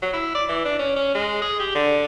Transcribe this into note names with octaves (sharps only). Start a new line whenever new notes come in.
F#3
E4
D5
E3
D4
C#4
C#4
G#3
G#4
G4
D3